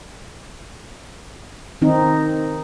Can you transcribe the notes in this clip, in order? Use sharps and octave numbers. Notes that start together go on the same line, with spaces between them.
D#3 C4 D#4